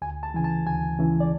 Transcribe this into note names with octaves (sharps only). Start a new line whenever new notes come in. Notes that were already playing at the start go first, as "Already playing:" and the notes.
D2 G#5
A5
C#3 E3 G#5
A5
D2 G#5
C#3 E3
D5